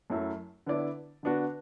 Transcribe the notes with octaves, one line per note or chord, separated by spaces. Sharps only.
F#2 F#3 A3 E4
D3 B3 E4 D5
D3 B3 D4 F#4